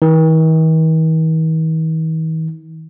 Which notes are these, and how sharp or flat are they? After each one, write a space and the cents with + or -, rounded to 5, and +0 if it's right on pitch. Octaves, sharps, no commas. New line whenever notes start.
D#3 +45